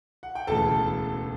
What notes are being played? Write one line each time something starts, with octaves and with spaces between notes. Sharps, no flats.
F#5
G5
E1 D2 C#3 E3 A4 A5